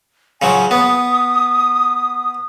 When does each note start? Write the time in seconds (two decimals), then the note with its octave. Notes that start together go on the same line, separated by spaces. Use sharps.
0.42 C#3 F3 F#3 G#5
0.71 B3 D#6